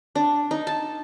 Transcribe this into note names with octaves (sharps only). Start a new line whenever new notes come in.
D4
D#4
A5